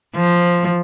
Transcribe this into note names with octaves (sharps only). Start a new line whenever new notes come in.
F3